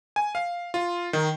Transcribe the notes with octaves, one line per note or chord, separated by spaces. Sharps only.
G#5
F5
F4
D#3